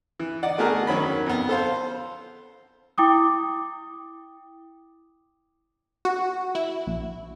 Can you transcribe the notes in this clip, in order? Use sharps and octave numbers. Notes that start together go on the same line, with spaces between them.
E3
D#4 D5 F#5
A3 B3 F#4 G#4 A#4
D#3 F#3 C#4 B5
F2 B3
A4 C5 F5
E4 G5 D6 D#6
F#4
E4
A#1